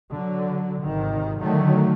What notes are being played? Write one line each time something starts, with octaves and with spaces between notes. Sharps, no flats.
D3 F#3
G#1 C3 D#3
D3 D#3 F#3 A3